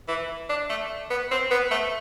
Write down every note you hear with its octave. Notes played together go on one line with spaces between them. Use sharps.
E3
D4
A3
B3
C4
B3
A3